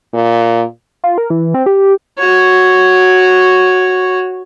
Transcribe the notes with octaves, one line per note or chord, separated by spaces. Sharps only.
A#2
F4
A#4
E3
C4
G4
F#4 C#5